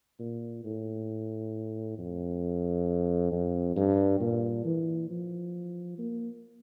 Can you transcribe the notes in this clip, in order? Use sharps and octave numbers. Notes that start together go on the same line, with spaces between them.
A#2
A2
F2
F2
G2
A#2
E3
F3
A#3